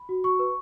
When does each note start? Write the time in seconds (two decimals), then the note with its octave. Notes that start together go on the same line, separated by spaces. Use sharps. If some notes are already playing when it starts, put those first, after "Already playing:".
Already playing: B5
0.09 F#4
0.24 F#4 C#6
0.39 B4